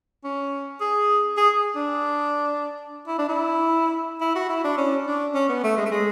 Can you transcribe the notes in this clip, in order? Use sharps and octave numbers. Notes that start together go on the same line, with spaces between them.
C#4
G#4
G#4
D4
E4
D4
E4
E4
F#4
E4
D4
C#4
D4
C#4
B3
A3
G#3
A3
G#3